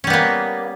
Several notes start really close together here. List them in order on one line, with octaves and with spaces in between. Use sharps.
C#4 G3 B3 A#3